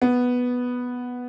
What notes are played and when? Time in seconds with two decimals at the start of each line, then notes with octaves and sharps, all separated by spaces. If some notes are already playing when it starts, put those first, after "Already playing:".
0.02 B3